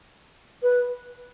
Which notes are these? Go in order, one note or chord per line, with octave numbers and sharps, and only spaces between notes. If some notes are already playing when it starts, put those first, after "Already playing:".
B4